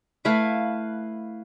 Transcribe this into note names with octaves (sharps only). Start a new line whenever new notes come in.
A3 E4 B4 F5